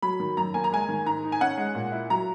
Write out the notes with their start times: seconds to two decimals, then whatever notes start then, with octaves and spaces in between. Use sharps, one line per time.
0.02 F#3 B5
0.20 D#3
0.37 F#2 A#5
0.54 A#3 G#5
0.64 A#5
0.72 G#3 G#5
0.89 D#3
1.06 G#2 A#5
1.24 D#4
1.32 G#5
1.41 C#4 F#5
1.58 G#3
1.75 A#2
1.92 E4
2.10 F#3 A#5